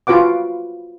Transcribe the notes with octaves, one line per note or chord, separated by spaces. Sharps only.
F4 F#4 B4 F#5 D6